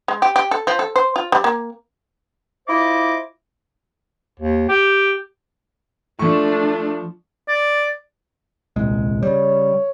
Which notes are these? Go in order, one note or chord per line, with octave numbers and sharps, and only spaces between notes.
G#3
G4
G4
A4
F3
A4
C5
F4
G3
A#3
E4 F4 C5 D#5 D6
D#2
G4
F3 A3 D4 C#6
D5
D#1 C2 G#3
C#3 G3 C#5